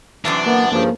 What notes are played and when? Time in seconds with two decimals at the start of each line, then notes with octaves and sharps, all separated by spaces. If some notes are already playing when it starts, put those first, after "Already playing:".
0.25 F#2 C3 E3 D4
0.46 A#3 B3
0.72 G2 C#3 F3 A#3